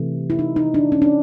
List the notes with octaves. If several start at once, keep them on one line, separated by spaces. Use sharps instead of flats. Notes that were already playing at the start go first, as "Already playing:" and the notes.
Already playing: C3 E3 A3
E4
D#4
D#4
D4
C#4
D4